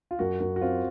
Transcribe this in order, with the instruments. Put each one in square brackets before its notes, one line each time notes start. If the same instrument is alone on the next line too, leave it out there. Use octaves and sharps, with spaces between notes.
[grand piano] F4
[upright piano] F#2 [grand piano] F#4
[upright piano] F#2 [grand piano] F#4
[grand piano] F#4
[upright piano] C4 [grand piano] F4